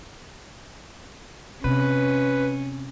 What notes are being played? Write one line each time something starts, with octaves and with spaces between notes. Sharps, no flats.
C3 C#4 B4